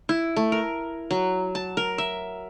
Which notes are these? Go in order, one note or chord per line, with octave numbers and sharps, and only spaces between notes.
E4
A3
A#4
F#3
A5
A#4
E5